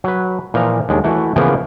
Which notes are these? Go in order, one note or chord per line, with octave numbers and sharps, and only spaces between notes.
F#3 B4
A#2 E3 F3 A#5
D#2 G#3 D4
E3 A3 E4 F#4
C#3 E3 F3 A#3 B3 A#4